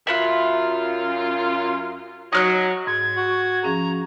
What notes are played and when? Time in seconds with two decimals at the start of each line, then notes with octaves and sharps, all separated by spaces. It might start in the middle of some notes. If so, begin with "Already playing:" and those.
0.07 F#2 F4 E5 B5 F#6
2.33 F#3 D#4 F6 F#6
2.87 G#2 G#6
3.17 F#4
3.63 F3 C#4 G#4 A#5